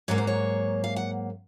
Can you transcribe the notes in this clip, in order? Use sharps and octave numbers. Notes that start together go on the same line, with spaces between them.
G#2 F#3 A#3 C#5
C5
C#5
F5
F#5